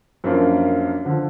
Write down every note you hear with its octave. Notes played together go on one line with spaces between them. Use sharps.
F#2 F3 A#3 D4
D3 F3